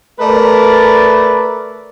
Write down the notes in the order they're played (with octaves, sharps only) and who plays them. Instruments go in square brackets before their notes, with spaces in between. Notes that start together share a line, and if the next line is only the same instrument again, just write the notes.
[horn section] A3 A#4 B4 D5